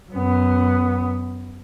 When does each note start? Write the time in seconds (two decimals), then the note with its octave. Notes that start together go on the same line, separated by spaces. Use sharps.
0.11 F#2 B3